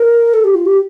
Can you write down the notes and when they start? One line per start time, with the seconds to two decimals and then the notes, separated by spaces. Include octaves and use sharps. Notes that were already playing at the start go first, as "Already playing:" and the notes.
Already playing: A#4
0.33 A4
0.44 G4
0.55 F4
0.66 G4